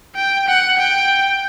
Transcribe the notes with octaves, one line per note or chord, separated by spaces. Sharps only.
G5
F#5
G5